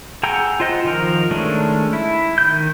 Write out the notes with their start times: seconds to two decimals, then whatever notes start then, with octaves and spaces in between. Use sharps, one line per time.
0.23 G#4 F#5 G5 A#5 E6
0.60 F4 C5 D#5 F#5
0.84 D#3 F3 A#4
1.31 D#3 G#3 A3 C#4 D4
1.93 E4
2.38 D#3 G6